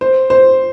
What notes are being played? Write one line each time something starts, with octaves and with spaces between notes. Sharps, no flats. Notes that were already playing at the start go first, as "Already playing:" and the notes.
C5
C5